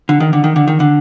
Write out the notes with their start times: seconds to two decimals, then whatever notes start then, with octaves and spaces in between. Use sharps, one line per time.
0.09 D3
0.20 D#3
0.33 D3
0.44 D#3
0.56 D3
0.68 D#3
0.80 D3